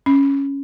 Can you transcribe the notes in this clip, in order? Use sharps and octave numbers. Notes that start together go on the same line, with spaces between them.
C#4